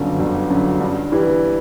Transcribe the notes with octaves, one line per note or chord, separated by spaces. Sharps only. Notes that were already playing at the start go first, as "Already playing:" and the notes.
Already playing: G1 F#2 D3
G1
F#2 D3
G2
E3 G3